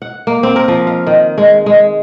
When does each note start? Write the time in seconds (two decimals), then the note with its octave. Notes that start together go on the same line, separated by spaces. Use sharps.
0.02 F#5
0.27 A#3
0.43 C4
0.56 A#4
0.68 F3
0.87 F5
1.07 D#3
1.38 G#3
1.66 G#3